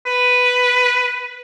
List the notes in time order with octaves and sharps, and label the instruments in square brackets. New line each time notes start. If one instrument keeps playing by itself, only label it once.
[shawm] B4